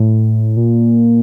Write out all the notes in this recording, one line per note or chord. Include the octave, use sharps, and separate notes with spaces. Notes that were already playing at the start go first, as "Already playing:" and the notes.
Already playing: A2
A#2